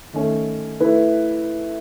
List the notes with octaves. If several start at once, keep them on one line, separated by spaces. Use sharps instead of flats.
D#3 A3 C#4
A3 E4 B4